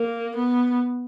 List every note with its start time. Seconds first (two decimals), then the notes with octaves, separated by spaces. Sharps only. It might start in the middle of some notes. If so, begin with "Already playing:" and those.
Already playing: A#3
0.36 B3